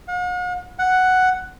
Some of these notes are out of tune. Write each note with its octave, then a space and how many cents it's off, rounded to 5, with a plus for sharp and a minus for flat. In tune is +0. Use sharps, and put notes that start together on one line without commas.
F#5 -45
F#5 +5